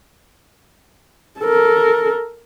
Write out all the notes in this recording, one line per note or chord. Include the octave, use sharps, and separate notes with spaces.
A4 A#4